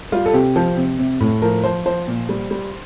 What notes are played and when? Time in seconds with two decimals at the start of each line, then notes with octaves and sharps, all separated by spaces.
0.12 G3 F4
0.26 A4
0.33 C3 G4
0.56 F3
0.77 C3
0.99 C3
1.20 A2
1.42 F3 A#4
1.64 F3 C5
1.86 F3 C5
2.08 A#2
2.29 G3
2.51 G3